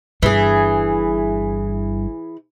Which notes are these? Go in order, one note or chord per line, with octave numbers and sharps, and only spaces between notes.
G1 G2 E3 G#4